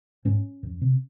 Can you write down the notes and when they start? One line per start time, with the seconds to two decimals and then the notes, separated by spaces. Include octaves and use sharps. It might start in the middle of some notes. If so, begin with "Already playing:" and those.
0.25 G#2 C#4
0.63 F2
0.81 C3